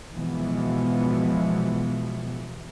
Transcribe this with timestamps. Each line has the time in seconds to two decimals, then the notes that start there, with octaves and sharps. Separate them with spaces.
0.14 B2 E3 F3 G#3 B3